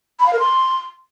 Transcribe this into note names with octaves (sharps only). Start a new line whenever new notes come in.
B5
F5
A#4
C6